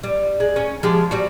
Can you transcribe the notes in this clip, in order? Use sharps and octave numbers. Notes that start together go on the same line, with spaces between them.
G3
G#3
C#4
F3 G#3 G4
G3 F#4